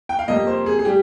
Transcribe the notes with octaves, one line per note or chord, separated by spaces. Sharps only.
G5
F5
F2 C3 G3 A#3 D#5
C5
G#4
G#4
G3 G4